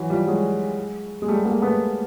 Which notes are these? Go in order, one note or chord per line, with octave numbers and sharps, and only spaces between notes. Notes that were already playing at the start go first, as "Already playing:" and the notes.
Already playing: E3 F#3
F3 G3
F#3 G#3
G#3
G3 A3
G#3 A#3
A3 B3